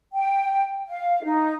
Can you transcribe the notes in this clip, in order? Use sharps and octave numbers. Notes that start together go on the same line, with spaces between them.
G5
F5
D#4